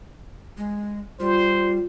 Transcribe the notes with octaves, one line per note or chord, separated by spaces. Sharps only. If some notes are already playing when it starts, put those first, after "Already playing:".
G#3
G3 F4 C5